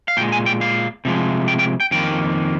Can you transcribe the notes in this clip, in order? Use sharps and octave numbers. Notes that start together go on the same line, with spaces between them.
F5
A#2 G#3 G5
G#5
G5
F5
C3 F3 G#3
G5
G5
G5
F2 D#3 A#3 G5